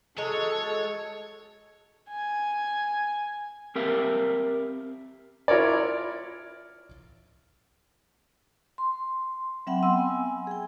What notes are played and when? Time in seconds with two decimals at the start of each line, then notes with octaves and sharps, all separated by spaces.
0.18 F#3 G#3 A4 C#5
2.09 G#5
3.75 C4 G4 A#4 E5 F5
5.48 E4 F4 A#4 C#5 D5
8.78 C6
9.67 F#3 C4 E5 F#5 G5 B5
9.83 F#3 B3 E5 C6 E6
9.97 G#5
10.47 G#4 G5